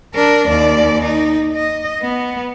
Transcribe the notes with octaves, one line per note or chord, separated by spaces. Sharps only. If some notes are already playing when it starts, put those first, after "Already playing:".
D4 A#4
D#2 D5
D#4
D#5
B3